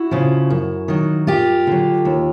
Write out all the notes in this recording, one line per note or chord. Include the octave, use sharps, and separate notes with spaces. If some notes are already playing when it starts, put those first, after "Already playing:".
Already playing: E4 F#4
C#3 F3
F#2
D#3 F#3
F#2 F4 G4
D3 F#3
D#2